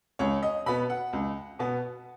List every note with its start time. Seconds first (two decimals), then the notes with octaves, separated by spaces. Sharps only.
0.19 C#2 C#5
0.43 D#5
0.66 B2 B3 B5
0.90 F#5
1.13 C#2
1.59 B2 B3